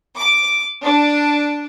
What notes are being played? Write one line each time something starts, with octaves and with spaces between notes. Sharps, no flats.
D6
D4